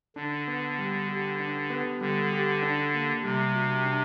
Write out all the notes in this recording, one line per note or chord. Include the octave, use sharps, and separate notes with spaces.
D3 D4
B3
G3
G4
D4
B3
D3 G3
G4
D4
A#3
C3 G3
F#4
D4